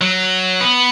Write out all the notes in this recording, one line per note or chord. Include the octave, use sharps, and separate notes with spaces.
F#3
B3